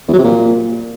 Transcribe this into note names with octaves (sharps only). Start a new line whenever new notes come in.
E2
F#3
C3
A#2